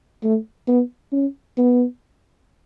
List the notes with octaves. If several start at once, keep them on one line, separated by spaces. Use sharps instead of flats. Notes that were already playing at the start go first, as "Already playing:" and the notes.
A3
B3
C#4
B3